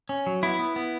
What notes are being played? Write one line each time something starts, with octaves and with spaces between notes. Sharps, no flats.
C#4
F#3
B3 E4
B3
B3